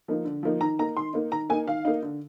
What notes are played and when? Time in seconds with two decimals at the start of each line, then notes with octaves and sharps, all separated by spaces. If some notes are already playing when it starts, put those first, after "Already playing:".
0.08 F3 A#3 D#4
0.25 D3
0.43 F3 A#3 D#4
0.61 D#3 A#5
0.79 A#3 D#4 A#5
0.96 D#3 C6
1.14 A#3 D#4
1.31 D#3 A#5
1.50 A#3 G#5
1.53 D#4
1.67 D#3 F5
1.85 A#3 D#4
2.03 D3